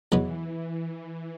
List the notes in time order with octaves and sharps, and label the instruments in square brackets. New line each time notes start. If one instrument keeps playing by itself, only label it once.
[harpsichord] E2 B2 F#3 B3 [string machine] E3